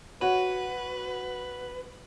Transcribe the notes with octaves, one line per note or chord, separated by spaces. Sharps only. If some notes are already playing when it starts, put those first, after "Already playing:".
F#4 B4 C#5